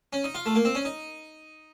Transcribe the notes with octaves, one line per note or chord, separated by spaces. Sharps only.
C#4
D#4
F4
A3
A#3
C4
C#4
D#4